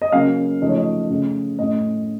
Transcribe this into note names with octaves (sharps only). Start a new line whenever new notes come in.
D#5
C#3 F#3 A#3 C#4 F5
C#3 F3 A3 D#4 D#5
C#5
D#5
C#3 A3 C#4
A2 A3 C#4 D#5